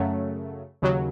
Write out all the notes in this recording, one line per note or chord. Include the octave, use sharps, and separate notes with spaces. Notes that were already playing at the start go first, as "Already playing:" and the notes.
Already playing: F#2 C#3 F#3 A3
D#2 C#3 F#3